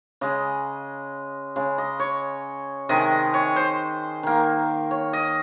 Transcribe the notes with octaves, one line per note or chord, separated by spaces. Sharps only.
C#3 G#3 D#5
C#3 G#3
D#5
C#5
C3 D#3 G#3 D#5
C#5
C5
D#3 A#3
C#5
D#5